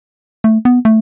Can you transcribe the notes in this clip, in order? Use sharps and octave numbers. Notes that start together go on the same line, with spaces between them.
A3
B3
A3